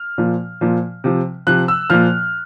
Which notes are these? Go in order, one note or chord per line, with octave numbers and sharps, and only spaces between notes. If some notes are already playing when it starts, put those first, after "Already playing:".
Already playing: F6
A#2 F3
A#2 F3
C3 F3
C3 F3 F#6
E6
A#2 F3 F6